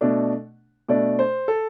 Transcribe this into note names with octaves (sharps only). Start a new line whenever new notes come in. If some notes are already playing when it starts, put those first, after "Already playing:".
B2 A3 D4
B2 A3 D4 D5
C5
A4